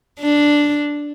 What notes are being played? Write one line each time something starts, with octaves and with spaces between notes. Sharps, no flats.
D4